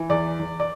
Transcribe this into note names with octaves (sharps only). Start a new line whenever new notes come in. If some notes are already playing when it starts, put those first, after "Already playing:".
Already playing: E3
E2 D5
E2
D5